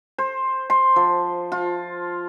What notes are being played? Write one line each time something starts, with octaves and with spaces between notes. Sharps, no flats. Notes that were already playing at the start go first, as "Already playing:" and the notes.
C5
C6
F3
F4